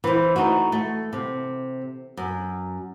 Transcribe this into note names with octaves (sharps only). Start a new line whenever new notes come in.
E3 C5
A3 D#4 F#4
A3
C3
F#2